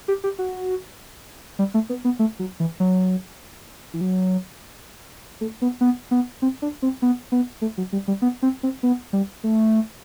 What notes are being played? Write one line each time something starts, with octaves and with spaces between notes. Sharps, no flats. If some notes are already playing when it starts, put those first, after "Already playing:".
G4
G4
F#4
G3
A3
B3
B3
A3
F#3
E3
F#3
E3
F#3
A3
B3
B3
B3
C4
D4
C4
B3
B3
A3
F#3
G3
G3
B3
C4
C4
B3
G3
A3